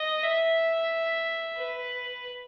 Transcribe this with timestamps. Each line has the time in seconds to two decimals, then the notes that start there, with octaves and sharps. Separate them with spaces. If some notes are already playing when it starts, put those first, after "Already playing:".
Already playing: D#5
0.24 E5
1.57 B4